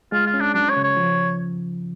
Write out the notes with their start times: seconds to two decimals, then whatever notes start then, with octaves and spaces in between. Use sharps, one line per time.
0.12 G#3 F4
0.26 F4
0.34 C#4
0.40 D4
0.54 F#3 D4
0.69 C#5
0.77 C#3
0.83 C#5
0.97 F3